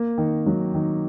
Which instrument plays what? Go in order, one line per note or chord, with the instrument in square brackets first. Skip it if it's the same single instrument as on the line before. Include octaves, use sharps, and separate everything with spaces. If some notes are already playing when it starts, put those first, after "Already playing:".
Already playing: [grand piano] A#3
D#3
F#3
D#3